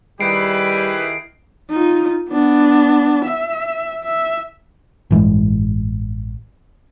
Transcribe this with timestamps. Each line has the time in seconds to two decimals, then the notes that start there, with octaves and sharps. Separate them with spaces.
0.20 D#3 G3 E4 G4 G#4 B4 C7 D7
1.70 D#4 F4
2.30 B3 D4
3.25 E5
4.04 E5
5.11 A1 G2 E3 G#3